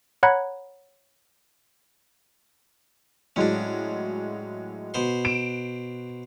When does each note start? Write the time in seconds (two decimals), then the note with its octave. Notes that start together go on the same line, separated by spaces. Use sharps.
0.23 C#5 F#5 A#5 B5 F#6 G#6
3.36 A2 F#3 G#3 C#4 D4
4.94 B2 C5 C6
5.25 D7 E7